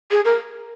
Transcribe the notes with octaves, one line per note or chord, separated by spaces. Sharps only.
G#4
A#4